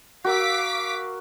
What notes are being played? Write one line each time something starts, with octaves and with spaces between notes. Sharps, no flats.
F#4 A#4 F5 D6 E6 B6